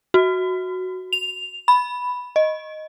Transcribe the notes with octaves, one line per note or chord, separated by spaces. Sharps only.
F#4
F7
B5
D#5